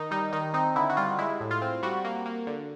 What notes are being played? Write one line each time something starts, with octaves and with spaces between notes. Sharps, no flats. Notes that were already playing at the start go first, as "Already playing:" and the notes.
Already playing: D#3 D#4
G3 D#4
D#3 D#4
C4 D#4
D3 E4
F#4
G3 F4
G#3 E4
A2
F4
C4
G3 F#4
A#3
A#3
D3